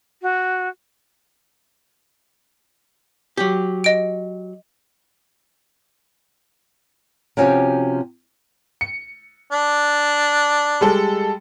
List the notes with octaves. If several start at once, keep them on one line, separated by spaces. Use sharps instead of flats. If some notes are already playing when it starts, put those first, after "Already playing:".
F#4
F#3 G4
D#5 D7
C3 F3 C#4 F#4 G4 G5
C#7
D4
G3 G#3 A4